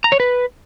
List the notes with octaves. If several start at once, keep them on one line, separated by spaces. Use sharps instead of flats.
A#5
C#5
B4